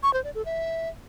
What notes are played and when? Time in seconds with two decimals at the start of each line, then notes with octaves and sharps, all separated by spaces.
0.03 C#6
0.14 C5
0.24 D5
0.35 A4
0.45 E5